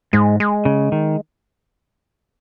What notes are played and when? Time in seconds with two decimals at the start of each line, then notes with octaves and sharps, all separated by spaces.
0.13 G#2 G#3
0.40 G#3
0.65 C#3
0.92 D#3